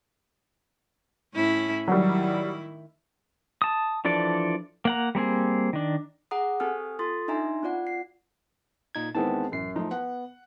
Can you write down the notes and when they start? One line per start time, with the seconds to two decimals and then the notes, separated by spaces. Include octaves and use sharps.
1.34 A2 C#4 E4
1.88 D#3 F#3 G3 E4
3.62 A5 D#6
4.05 E3 F3 D4 A4 D5
4.85 A#3 F#5 A#5
5.15 G3 A#3 C4 G#4
5.73 D#3 D4
6.31 G#4 F#5 A#5 D#6
6.60 C4 G4 A4 G#5 D#6 F6
6.99 F4 A4 C6 D#6 A6
7.28 D4 D#4 E5 G#5 A#5 C6
7.63 C4 F4 D5 F#5
7.87 C7
8.95 A#2 D#4 G#6
9.15 E2 D#3 G#3 B3 C4 A5
9.52 A1 F#2 C7
9.76 F3 A3 D#4
9.91 B3 F#5